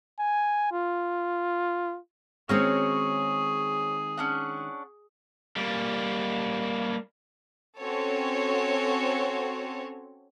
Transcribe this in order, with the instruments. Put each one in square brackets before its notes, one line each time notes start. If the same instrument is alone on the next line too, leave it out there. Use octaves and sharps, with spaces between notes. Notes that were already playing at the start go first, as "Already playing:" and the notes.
[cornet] G#5
F4
[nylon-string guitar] D#3 G#3 C4 [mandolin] C#4 F#4 C#5 [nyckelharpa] G#4
[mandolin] C#4 D4 F#5
[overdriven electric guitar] G3 A#3
[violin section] C4 C#4 F#4 A4 C#5